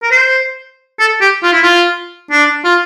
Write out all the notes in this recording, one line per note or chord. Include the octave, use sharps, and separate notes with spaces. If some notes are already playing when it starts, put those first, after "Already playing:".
A#4
C5
A4
G4
F4
E4
F4
D4
F4